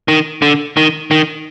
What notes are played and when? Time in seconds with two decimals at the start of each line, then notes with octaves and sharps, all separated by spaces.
0.08 D#3
0.42 D3
0.77 D#3
1.11 D#3